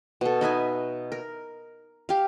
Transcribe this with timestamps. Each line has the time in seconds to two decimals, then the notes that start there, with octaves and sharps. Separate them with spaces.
0.21 B2 A4
0.41 D#4 B4 E5 G#5
1.12 A#4
2.09 G4 F5